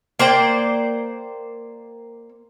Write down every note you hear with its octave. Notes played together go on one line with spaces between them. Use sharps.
A#3 C5 D5 G5